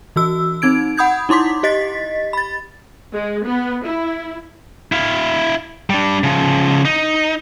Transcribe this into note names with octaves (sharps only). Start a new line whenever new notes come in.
E3 F#4 E6
C4 D#4 G#6 D7
F#5 B5 D#6 G6 G#6
D#4 E4 C6 D6 B6
G4 D#5 A6 B6
B5 A6
G#3
B3
E4
E4 F5
G3 D4
C#3 F3
D#4